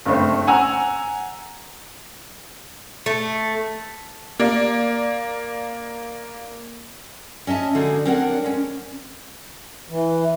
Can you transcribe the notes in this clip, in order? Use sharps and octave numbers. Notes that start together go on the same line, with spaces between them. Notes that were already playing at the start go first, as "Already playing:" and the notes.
F#1 G2 A3 C4
F#5 G#5 A#5 E6
A3
A#3 D5
C#4 D#5 E5 A5
D3 G#3 D#4 F#4
C4 D4 A#4 C#5 D5 F#5
G#3 C#4
E3